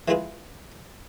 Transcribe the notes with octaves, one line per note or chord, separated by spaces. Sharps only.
E3 G#3 E4 F4 G#4 B4